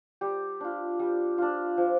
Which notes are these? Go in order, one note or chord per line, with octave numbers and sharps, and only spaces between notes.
G3 G4
D4 F4
G3
D4 F4
F3